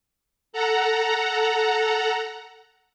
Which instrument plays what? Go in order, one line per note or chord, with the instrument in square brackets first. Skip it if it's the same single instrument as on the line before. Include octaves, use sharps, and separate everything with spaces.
[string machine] A4 F#5 A#5